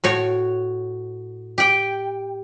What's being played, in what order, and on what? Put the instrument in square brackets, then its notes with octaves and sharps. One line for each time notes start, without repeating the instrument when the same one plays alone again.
[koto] A2 F#4 C#5
G4 G5